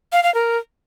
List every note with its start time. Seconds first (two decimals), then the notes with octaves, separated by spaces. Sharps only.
0.12 F5
0.23 F5
0.34 A#4